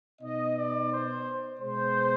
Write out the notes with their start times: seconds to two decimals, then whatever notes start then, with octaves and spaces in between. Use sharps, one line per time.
0.21 B2 B3 D#4 D#5
0.55 D5
0.90 C5
1.59 B2 G#3 B3 C5